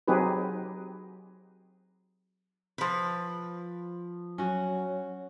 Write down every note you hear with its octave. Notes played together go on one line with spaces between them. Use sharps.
F#3 C4 D#4 G4 G#4 B4
F3 B4
F#3 C#4 F#4